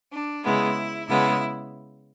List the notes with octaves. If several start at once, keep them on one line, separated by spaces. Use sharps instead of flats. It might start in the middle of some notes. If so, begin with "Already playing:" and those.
D4
C#3 G#3 B3 E4
C#3 G#3 B3 E4